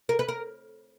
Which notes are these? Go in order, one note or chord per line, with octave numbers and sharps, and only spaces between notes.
A#4
B4
A#4